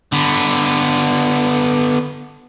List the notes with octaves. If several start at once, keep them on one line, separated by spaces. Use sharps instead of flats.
D3 B3